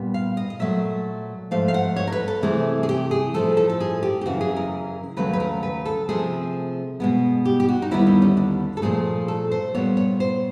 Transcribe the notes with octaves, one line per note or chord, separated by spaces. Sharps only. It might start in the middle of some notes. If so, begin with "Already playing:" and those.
Already playing: A#2 G3 B3
F5
D#5
D#5
A#2 F#3 A3 E5
G#2 F3 A3 F5
F5
F#5
C#5
A#4
B4
A4
C3 E3 A3 G#4
G#4
G4
G#4
A2 F3 A3 A4
A4
A4
G#4
G4
G4
F#2 C#3 E3 F#4
G#4
A#4
D#2 C#3 F#3 A3 B4
B4
A#4
B4
A4
C3 F3 A3 G#4
B2 G#3 B3
G4
G4
F#4
D#4
D#2 D3 G3 B3 E4
D#4
C#4
D4
A4
A#2 F3 A3 G#4
A4
C5
A#2 G3 B3 C#5
C#5
C5